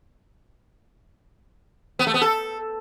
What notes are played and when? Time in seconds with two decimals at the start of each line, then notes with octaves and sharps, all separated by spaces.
1.99 B3
2.07 A3
2.14 B3
2.22 A4